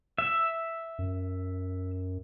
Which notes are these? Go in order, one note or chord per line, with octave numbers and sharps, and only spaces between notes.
E5
F#2